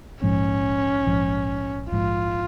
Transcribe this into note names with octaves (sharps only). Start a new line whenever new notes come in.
A#1 G#2 F3 C#4
A#1 G#2 F3
A#1 G#2 F3 F4